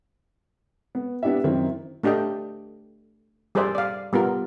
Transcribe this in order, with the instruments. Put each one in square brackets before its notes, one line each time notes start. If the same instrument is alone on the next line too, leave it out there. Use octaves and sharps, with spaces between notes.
[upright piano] B3
B3 D4 E4 G4 E5
F#2 D#3 C4 E4
[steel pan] A3 D4 G4 D#5 G5
G3 G#4 A#4 C5 D5 E5
D5 F5
G3 B3 F4 A#4